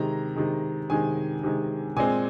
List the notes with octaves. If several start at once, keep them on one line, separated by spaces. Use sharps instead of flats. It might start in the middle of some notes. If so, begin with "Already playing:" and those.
Already playing: C3 D#3 G#3 A#5
C3 D#3 G#3
C3 D#3 G#3 G#5
C3 D#3 G#3
A#2 G#3 C4 G#5